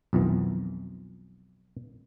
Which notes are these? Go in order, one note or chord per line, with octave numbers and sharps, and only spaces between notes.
B1 F2 D#3 E3